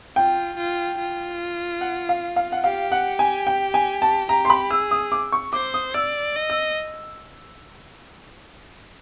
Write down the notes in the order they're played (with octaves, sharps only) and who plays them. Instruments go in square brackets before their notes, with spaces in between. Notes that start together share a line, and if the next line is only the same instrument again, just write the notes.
[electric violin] F4 [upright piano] G5
[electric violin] F4
F4
[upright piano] F#5
F5
F5
F#5
[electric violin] G4 [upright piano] F5
[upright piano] F#5
G#5
G5
G#5
A5
[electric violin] G4 [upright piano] A#5
[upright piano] C6
B5
[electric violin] G#4 [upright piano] E6
[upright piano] D#6
D6
C#6
[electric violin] C5 [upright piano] D6
[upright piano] D#6
[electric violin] D5 [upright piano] E6
[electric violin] D#5
[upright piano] E6